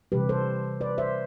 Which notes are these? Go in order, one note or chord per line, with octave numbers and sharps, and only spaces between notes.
C3 E3 G3 G4 B4
A4 C5
B4 D5
C5 E5